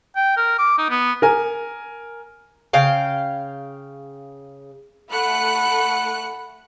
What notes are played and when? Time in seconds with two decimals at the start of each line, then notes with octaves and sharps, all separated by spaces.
0.16 G5
0.37 A#4
0.59 D6
0.78 D#4
0.90 B3
1.22 A#4 G#5
2.73 C#3 F5 G5
5.11 A3 F#5 B5 F#6 C#7